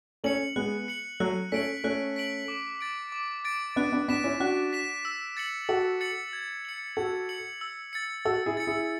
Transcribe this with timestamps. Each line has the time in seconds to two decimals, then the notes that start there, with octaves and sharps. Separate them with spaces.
0.24 A3 C#4 C#7 F#7
0.56 G#3 B3 F#6
0.88 C#7 F#7
1.20 F#3 A3 F#6
1.52 A3 C#4 B6 D7 F#7
1.84 A3 C#4 F#6
2.16 B6 D7 F#7
2.48 D6
2.81 A6 D7
3.12 D6
3.45 A6 D7
3.76 B3 D4 F#6
3.92 B3 D4
4.08 B3 D4 B6 E7
4.24 C#4 E4
4.40 D4 F#4 F#6
4.73 B6 E7
5.05 E6
5.37 A6 C#7 F#7
5.69 F#4 A4 E6
6.01 A6 C#7 F#7
6.33 G#6
6.65 C#7 F#7
6.97 F#4 A4 G#6
7.29 C#7 F#7
7.61 E6
7.93 A6 C#7
8.25 F#4 A4 E6
8.46 E4 G#4
8.57 A6 C#7
8.67 E4 G#4